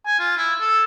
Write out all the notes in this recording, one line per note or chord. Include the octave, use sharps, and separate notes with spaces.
G#5
F4
E4
A4